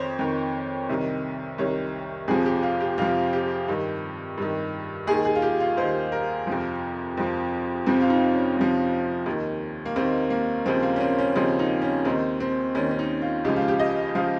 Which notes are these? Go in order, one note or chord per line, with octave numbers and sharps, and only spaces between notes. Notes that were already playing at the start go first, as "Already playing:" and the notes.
Already playing: F2 D#3 C5 C#5
F2 D#3
C2 C3 D#3
C2 C3 D#3 C#5
F2 C3 F3 G#4
G4
F4
G4
F2 C3 F3 F4
G4
G2 D#3
G2 D#3
D#2 D#3 G#4
G#4
F4
G4
F4
D#2 D#3 C5
A#4
F2 C3 F3
F2 C3 F3
F2 C3 F3 C4
F4
D#4
C#4
F2 C3 F3
D#2 D#3
A#3
D#2 D#3 C4
A#3
D#2 C#3 F3 C4
A#3
C#4
C4
C#4
D#2 C#3 F3 C4
D#4
C#4
D#2 D#3 C4
C4
D#2 D#3 C#4
C#4
D#4
F4
C#2 C#3 F3 G4
F4
G4
D#5
C#3 F3 F5